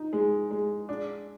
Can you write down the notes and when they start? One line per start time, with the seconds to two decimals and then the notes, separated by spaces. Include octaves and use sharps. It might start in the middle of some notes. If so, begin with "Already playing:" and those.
Already playing: D#4
0.13 G#3
0.51 G#3
0.89 D4